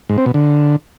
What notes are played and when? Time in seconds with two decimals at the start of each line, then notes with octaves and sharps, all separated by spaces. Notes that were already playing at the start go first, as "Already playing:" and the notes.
0.09 G#2
0.18 C4
0.26 B2
0.34 D3